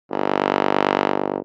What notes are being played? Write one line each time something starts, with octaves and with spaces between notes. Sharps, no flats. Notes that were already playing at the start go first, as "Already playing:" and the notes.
G1